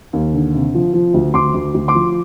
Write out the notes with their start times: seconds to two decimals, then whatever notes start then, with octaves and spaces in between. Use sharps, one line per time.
0.13 D#2
0.34 D3
0.54 C3
0.75 F3
0.93 F3
1.14 D2
1.34 D2 C6 D6
1.54 D2
1.74 D2
1.88 C6 D6
1.95 F3